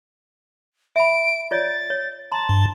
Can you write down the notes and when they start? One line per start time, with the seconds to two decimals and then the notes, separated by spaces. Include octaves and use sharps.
0.96 E5 B5 D7
1.51 F4 C#5 D5 A6
1.90 C#5
2.32 A5 A#5 C6
2.49 G2